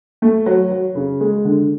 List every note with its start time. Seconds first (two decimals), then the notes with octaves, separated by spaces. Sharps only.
0.22 A3
0.46 F#3
0.71 F#3
0.95 C#3
1.20 G#3
1.45 D3